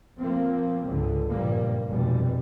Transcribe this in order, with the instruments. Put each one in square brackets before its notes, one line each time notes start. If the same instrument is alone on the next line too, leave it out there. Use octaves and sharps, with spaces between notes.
[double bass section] F3 A#3 C4
C#2 G#2 D3
F#1 G2 A#2 F3 G3 A#3
F1 E2 B2 G3